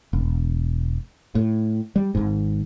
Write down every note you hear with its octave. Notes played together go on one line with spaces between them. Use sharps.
E1
A2
G3
G#1 G#2